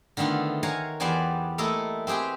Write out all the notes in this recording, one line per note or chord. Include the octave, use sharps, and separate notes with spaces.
D3 D#3 A3 B3 F4
A#4 C#5 F5 F#5 G#5 A#5
E2 B3 G4 C5 D5 G#5
A3 A#3 E4 A4 D#5
C4 G4 G#4 B4 G5